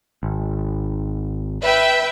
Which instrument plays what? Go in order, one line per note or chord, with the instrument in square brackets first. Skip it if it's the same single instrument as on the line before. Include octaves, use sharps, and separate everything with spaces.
[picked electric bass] G#1
[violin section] B4 E5 G5